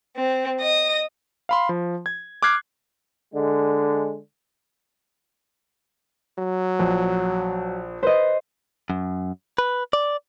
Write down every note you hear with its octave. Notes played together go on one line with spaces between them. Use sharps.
C4
D#5 D#6
F5 B5 C6
F3
G#6
D6 F6 F#6 G#6 C7
D3 G#3
F#3
A#1
B4 C5 D#5
F#2
B4
D5